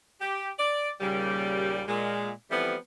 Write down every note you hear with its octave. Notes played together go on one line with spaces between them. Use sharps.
G4
D5
D#2 A#2 C#3 G3
A#2 G#3
E3 F3 G3 A3 B3 C4